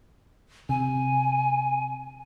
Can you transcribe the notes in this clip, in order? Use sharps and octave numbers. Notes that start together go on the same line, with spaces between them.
C3 G#5